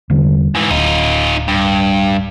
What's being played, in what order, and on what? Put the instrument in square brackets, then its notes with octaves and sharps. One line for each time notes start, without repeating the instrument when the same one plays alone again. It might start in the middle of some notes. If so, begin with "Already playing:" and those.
[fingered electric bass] E2 D3 G3
[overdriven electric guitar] G#2 E3
[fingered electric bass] D1 [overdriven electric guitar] D#4 F4
[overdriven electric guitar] G2